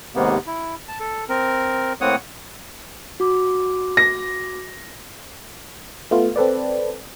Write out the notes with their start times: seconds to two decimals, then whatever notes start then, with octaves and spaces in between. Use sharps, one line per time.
0.15 D#2 G#2 C3 A#3 B3
0.47 E4
0.88 A5
1.00 A4
1.29 C4 A#4
2.01 A2 A#3 C4 C#5 F#5 D#6
3.20 F#4 D6
3.97 A#6
6.11 A3 B3 F4
6.36 C4 A4 B4 D5